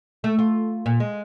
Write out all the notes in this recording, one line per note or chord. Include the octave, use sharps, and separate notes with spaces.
A3
F4
A#2
G#3